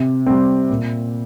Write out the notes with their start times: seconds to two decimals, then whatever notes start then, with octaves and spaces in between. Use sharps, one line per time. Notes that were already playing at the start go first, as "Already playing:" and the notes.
Already playing: C3
0.26 G3 C4
0.70 A#2